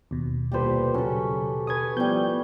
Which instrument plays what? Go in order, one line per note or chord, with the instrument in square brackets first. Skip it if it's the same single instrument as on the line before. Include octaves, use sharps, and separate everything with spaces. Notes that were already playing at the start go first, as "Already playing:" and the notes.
[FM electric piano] D#2 B2
[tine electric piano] C2 A#2 C5 [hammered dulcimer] G4 A4 B4
[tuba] C#3 [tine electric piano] F#3 [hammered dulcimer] C#4 A4
[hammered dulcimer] B4 C#5 G#5 [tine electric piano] D#6 G#6
[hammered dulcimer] A2 G3 [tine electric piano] F3 [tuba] B3 [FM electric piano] G6